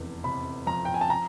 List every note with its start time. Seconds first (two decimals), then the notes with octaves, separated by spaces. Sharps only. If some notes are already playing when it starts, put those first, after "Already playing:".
Already playing: F1 E2
0.24 C3 B5
0.66 F3 A#5
0.85 G5
0.94 G#5
1.01 A5
1.10 A#5